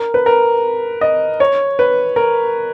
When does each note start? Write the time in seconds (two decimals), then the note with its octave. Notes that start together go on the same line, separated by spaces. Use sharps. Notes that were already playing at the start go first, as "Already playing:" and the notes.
Already playing: A#4
0.14 B4
0.26 A#4
1.01 D#5
1.40 C#5
1.79 B4
2.16 A#4